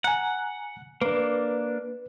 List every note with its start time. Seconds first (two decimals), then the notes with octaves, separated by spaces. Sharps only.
0.04 F#5 G#5 A#5
1.01 A#3 D4 B4